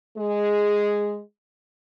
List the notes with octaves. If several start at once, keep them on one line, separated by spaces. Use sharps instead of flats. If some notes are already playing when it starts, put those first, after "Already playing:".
G#3 G#4